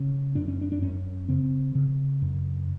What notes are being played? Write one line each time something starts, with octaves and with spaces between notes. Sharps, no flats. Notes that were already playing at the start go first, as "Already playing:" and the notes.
Already playing: C#3 C#4
F#2 D4
C#4
D4
D4
F#2 C#4
C#3 C4
C#3
F#2